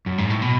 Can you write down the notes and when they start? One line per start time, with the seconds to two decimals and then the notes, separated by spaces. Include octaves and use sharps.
0.06 F#2
0.18 G#2
0.30 A2
0.42 B2